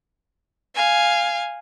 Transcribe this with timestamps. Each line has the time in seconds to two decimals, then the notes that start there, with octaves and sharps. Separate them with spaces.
0.75 F5 G#5